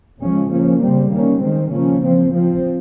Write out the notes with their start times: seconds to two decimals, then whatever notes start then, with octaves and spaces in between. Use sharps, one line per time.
0.20 C#3 F3 G#3 C#4
0.50 F3 A#3 C#4
0.81 C#3 G3 C4
1.11 D#3 A#3 C#4
1.41 D#3 G#3 C4
1.71 C#3 F3 A#3 C#4
2.02 F3 C4
2.32 F3 C4